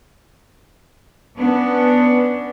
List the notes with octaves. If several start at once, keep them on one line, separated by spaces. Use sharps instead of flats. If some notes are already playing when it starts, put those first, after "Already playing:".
B3 C#4 D4